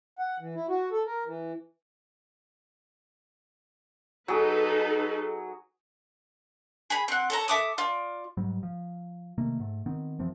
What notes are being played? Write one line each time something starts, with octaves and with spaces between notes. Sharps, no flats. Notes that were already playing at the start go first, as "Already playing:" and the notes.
F#5
E3
E4
F#4
A4
A#4
E3
F#3 D#4 G#4 A4 B4
G#4 G#5 B5
C4 F#5
A4 C#5 A#5
A4 E5 D6 D#6
F4 D5
G#2 F#3 G3
F3
C3 D#3 A3 A#3
G#2 A3
D#3 B3 C4
F#2 E3 F3 C4